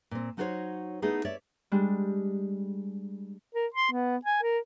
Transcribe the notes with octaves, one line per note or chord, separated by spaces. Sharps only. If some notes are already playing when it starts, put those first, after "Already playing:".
A#2 C4
F#3 D#4 F#4 A4 C5 C#5
A3 B3 D#4 E4 G#4
C#5 D5 E5
G3 G#3 D4
A#4
C6
B3
G#5
A#4